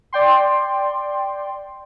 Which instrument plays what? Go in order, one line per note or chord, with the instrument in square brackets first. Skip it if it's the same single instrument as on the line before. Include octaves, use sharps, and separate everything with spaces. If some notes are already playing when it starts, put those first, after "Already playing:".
[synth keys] D5 G5 C6